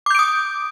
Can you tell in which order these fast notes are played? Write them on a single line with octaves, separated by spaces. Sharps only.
D6 G6 D7 D#6